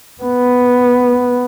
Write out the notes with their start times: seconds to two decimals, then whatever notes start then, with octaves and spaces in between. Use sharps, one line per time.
0.22 B3